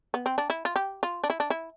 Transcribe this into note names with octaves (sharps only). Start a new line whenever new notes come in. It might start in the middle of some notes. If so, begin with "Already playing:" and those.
B3
C4
D4
E4
F4
G4
F4
D4
E4
D4
E4